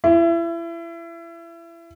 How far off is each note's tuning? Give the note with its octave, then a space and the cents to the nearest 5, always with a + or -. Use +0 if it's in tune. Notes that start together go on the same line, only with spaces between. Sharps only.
E4 +30